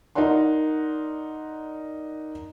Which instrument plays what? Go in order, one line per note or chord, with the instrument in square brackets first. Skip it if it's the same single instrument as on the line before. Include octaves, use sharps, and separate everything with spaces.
[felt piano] D#4 A#4 D5 F#5 C6